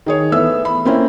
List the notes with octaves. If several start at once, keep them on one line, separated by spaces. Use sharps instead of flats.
D#3 G#4 C#5
E3 A3 B3 E5 E6
B5
A#3 C4 C#4 E4